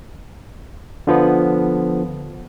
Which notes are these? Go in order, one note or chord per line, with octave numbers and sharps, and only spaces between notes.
D3 F3 B3